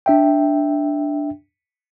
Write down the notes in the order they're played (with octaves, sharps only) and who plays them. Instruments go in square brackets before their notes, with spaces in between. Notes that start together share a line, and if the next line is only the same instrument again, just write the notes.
[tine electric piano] D4 E5 G5